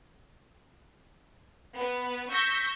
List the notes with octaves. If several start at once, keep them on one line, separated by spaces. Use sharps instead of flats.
B3 B4
C#6 E6 G6 A#6 B6